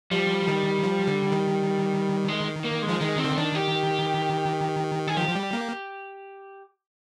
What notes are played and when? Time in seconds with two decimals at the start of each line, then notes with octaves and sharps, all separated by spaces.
0.11 F3 G3
0.48 D#3
0.84 F3
1.07 D3
1.32 D#3
2.28 G#3
2.64 A#3
2.82 G#3
2.89 F3
3.00 D#3 G#3
3.18 C4
3.24 D3
3.36 D#3 D4
3.55 G4
5.08 G#4
5.17 F3 G4
5.28 F3
5.35 G3
5.53 A#3